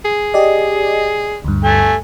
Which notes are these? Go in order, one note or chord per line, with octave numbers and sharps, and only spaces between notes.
G#4
G4 D5 D#5
D2 G2
A3 G#5